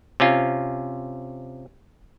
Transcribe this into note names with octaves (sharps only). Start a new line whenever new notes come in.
C3 C#4 F4